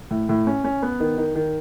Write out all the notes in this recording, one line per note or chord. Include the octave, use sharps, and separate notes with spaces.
A2
A2
C#4
C#4
B3
D#3
D#3
D#3